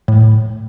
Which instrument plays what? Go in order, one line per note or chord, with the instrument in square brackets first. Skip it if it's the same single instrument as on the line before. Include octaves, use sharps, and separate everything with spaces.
[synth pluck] A2